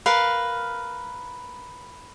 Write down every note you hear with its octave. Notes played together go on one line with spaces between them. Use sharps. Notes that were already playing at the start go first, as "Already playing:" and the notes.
A#4 B4 F5